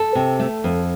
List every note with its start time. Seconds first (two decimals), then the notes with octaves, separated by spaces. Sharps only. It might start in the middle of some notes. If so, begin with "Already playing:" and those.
Already playing: A4
0.15 C3
0.39 A3
0.64 F2